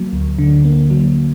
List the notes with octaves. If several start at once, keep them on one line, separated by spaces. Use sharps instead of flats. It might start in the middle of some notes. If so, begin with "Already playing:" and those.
Already playing: F#3 A#3
D2
D3
A#3
F#3